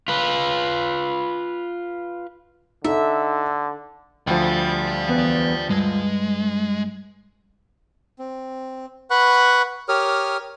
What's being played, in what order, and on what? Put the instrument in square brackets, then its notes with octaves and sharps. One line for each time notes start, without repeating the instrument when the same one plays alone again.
[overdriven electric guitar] F4 B4
[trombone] D3 [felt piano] D#4 A4 [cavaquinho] E5
[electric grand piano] D2 F3 [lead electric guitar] D5 G5
[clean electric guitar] E2 B3
[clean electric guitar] G2 [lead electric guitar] G#3
[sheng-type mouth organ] C4
B4 F#5 B5 C#6 F#6
G4 A#4 C#5 D#6 F6